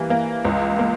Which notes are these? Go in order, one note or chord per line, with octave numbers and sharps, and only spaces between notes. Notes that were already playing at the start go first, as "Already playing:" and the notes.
Already playing: E3 G3 A#3
A#3
C#2
A#3